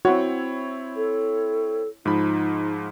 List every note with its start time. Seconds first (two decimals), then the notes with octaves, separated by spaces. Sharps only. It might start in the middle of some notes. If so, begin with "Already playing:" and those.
0.05 C4 E4 F#4 C#5
0.96 A4
2.06 G#2 F3 D#4 B5